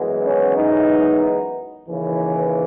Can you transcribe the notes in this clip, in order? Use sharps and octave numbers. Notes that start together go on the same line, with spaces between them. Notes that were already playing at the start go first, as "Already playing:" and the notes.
Already playing: F#2 E3 G#3 B3
C#4
D#4
D#2 C#3 E3